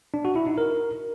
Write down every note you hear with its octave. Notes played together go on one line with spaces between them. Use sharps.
D4
F#4
E4
D#4
A#4